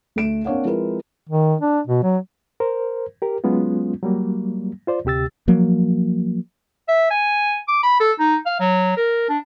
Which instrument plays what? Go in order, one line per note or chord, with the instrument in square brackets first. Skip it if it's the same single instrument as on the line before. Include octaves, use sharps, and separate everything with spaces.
[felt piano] D2 A3 D7 E7
A#3 C4 D4 C#5 F5 F#5
F3 G#3 C4 E4 A#4 B4
[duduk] D#3
D4
B2
F#3
[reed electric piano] A#4 C5
G4 A#4
F#3 G#3 B3 C#4 F4
F#3 G3 A#3
F4 C5 D5
D2 C3 G4 E6 A6
[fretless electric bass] F3 F#3 A#3
[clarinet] E5
G#5
D6
B5
A4
D#4
F5
F#3
A#4
D4